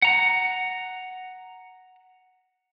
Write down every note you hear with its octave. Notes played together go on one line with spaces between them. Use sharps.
F#5 A#5